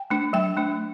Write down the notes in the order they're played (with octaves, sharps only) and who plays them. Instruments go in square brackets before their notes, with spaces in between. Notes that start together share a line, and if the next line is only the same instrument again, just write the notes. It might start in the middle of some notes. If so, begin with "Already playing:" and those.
Already playing: [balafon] G5
A3 D4
F#3 G5
A3 D4